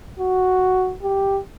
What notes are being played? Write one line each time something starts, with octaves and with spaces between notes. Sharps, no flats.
F#4
G4